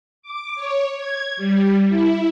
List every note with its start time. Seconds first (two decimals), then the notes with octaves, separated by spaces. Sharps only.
0.22 D6
0.55 C#5
0.97 G#6
1.37 G3
1.89 E4